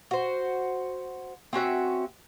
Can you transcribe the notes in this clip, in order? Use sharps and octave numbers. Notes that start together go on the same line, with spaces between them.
F#4 C5
C4 C#4 F#4 E5